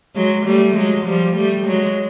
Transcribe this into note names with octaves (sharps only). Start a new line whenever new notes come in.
F#3 G#3
G3 A3
F#3 G#3
F3 G3
G3 A3
F#3 G#3